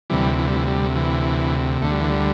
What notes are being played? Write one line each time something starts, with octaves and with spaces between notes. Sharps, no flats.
D2 C3 E3 G3
E3
G3
E3
G3
E3
D2 D3 A3
G3
E3
G3